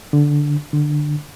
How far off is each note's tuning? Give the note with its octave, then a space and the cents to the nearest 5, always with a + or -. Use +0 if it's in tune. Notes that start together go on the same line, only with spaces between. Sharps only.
D3 -5
D3 +15